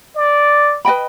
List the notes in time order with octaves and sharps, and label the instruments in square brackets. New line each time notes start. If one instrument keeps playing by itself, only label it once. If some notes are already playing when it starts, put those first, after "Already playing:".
[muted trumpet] D5
[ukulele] B4 D#5 G5 B5